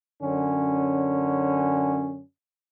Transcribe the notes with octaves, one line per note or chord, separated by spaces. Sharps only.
F#2 D3 C#4